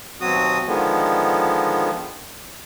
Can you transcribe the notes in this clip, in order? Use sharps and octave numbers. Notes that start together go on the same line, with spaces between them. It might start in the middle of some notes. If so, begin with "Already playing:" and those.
D#2 B2 F#3 C4 F#4 D#6
D3 D#3 F3 G#3 B3